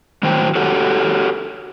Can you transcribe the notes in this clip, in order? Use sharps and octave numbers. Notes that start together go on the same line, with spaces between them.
A2 D#3 F#3 F#4 C5 G5
F#4 G4 A4 C#5 F#5